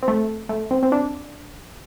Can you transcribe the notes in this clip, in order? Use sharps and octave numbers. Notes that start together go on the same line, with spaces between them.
C4
A3
A3
C4
C4
D4